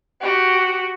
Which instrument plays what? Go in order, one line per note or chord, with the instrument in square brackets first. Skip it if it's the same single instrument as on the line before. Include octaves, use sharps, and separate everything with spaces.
[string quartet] F#4 G4